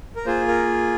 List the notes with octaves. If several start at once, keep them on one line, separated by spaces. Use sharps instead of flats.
A#4
A#3 F4 G#4 C5
A#4